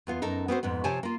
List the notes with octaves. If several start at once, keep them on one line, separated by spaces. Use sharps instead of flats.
E2 B3 F4
F#2 D#4 A4 A#4
B3 C4 F#4 C5
F2 G#2 B3
C3 F3 G4 C#5 G#5 A5
A#3 F4